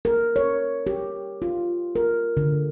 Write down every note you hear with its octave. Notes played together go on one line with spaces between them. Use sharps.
A#4
C#5
G4
F4
A#4
D3